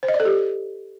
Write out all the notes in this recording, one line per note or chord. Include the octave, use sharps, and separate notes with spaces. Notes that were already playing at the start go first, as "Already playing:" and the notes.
C5
D#5
D5
A4
G4